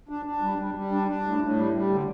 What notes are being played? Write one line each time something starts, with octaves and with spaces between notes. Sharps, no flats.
D4
D4
G3
G3
G3
D4
D4
A2
A2
G3
G3
D3